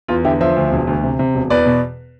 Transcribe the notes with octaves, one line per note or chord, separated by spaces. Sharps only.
E2 F4
D3 E4 G4
F3 C5 E5
D2
E1
D2
C3
C3
E1
E2 B4 D5
B2